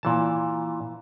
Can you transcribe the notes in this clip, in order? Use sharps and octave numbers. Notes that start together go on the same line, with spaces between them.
A#2 E3 A5